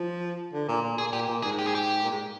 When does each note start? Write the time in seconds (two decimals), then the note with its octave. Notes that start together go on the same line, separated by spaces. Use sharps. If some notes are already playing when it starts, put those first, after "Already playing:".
Already playing: F3
0.53 D3
0.68 A#2
0.82 A#2
0.98 A#2 G#4
1.13 A#2 G4
1.28 A#2
1.43 G#2 G#4
1.59 G4
1.67 G#4
1.75 G4
2.03 A#2
2.11 G#2